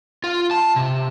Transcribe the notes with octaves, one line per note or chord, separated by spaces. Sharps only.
F4
A5
C3